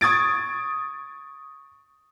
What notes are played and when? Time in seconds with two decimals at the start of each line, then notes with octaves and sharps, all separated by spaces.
0.01 C#6 D#6 G#6 A6 D7